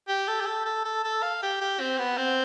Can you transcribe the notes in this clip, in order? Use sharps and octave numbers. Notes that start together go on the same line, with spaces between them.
G4
A4
G4
A4
A4
A4
A4
F5
G4
G4
C4
B3
C4